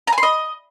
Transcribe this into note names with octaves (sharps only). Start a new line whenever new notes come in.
A#5
G#5
C6
D#5